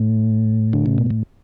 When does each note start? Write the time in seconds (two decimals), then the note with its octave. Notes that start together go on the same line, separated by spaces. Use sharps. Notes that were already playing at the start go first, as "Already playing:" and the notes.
Already playing: A2
0.73 D3
0.86 C#3
0.98 B2
1.10 A2